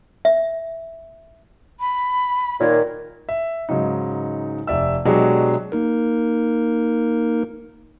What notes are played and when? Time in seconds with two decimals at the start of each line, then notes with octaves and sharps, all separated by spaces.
0.25 E5
1.80 B5
2.60 A#2 D#3 C#5
3.29 E5
3.69 G#2 C#3 F#3 D#4
4.67 F1 D5 E5 E6
5.05 B2 F#3 G#3 D4 G4 G#4
5.72 A#3 D#4 A#4